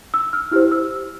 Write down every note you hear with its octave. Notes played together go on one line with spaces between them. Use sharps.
E6
F6
E4 G4 C5 F6
E6